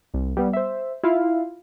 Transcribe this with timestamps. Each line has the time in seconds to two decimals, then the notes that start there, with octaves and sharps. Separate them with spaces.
0.14 C2
0.37 G3 B3
0.53 C5 E5
1.04 E4 F4 F5